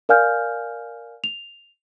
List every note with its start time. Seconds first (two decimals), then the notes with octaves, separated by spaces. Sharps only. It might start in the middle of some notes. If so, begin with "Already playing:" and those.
0.09 A#4 D5 F5 G#5 F6 G6
1.24 F7